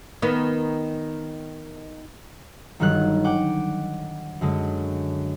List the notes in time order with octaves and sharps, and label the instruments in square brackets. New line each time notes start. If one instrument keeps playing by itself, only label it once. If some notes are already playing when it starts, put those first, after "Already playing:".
[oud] D#3 B3
[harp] G1 D#3 F#3 G3 F#6
F#5 G5 D6
F#2 D3 G#3